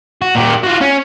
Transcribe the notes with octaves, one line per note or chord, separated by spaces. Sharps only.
F#4
A#2 G4
F4 F#4
C#4